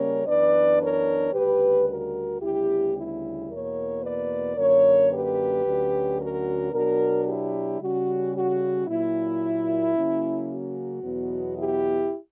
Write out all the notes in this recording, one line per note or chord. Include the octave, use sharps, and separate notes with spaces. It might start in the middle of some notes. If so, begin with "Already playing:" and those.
Already playing: C#3 G3 A#3 C#4 A#4 C#5
F#2 E3 B3 D4 B4 D5
A#4 C#5
D2 C#3 G3 G4 B4
F#4 A#4
D2 C#3 G3 B3 E4 G4
E4
E2 B2 A#3 A#4 C#5
B4 D5
F#2 D3 A#3 A#4 C#5
G4 B4
D2 D3 F#3 C#4
F#4 A#4
B2 F#3 B3 D4 F#4 A#4
E4 G4
C#3 G3 C#4 F#4
F#4
A#2 F#3 A#3 E4
C#3 F#3 A#3 C#4
F#4
E2 B2 F#3 B3
E4 G4